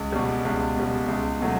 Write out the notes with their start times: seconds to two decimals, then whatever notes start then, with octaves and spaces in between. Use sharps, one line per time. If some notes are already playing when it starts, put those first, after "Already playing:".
Already playing: C#2
0.12 B2 G3
0.45 C#2
0.76 B2 G3
1.08 C#2
1.40 B2 F#3 A3